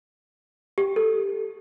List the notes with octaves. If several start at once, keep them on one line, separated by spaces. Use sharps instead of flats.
G4
A4